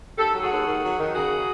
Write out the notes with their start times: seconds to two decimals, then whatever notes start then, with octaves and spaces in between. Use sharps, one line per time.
0.18 D#2 G4 A4
0.34 F#3
0.43 F#4 G#4
0.51 D#2
0.67 D#3
0.83 F#3
0.99 D#3
1.14 C#3 F#4 G#4
1.30 F#3